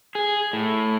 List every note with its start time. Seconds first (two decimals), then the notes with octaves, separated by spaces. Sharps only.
0.15 G#4
0.53 A2